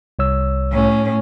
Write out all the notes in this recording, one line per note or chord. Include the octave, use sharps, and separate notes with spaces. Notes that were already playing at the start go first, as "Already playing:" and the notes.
C2 C#5 E6
A2 C#4